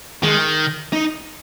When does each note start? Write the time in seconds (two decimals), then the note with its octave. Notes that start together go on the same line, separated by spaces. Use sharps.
0.23 D#3 G#3
0.93 D#4